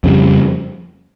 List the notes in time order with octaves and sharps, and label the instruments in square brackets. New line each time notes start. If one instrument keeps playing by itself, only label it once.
[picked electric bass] F2 C#3 G3